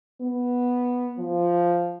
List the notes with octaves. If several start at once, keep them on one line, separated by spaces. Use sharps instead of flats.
B3
F3